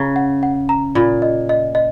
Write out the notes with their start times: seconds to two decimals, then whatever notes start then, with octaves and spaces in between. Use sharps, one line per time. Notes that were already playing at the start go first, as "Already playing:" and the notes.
Already playing: C#3 A#5
0.16 F#5
0.43 F#5
0.69 A#5
0.95 A#2 B5
1.22 D#5
1.49 D#5
1.75 D#5